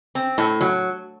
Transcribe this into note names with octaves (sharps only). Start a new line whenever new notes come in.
C4
A2
F#3